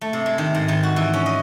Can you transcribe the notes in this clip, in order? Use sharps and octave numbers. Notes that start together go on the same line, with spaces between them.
A3
C3
G#3
D#3
G#2
D#3
F#4
E3
C#4
D#5